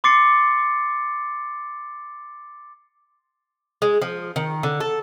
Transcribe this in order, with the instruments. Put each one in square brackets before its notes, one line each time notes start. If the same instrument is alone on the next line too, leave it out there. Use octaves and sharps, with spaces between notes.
[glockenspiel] C6 D6 A6 C7 C#7
[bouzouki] G#3
F3
D#3
D3
A4